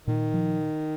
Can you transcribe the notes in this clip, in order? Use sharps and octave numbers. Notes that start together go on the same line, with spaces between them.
A#2 D#3
F3